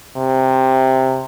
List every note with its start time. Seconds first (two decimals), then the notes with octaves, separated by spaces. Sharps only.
0.17 C3